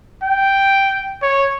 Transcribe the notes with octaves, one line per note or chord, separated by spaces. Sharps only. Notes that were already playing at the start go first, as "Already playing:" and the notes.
G5
C#5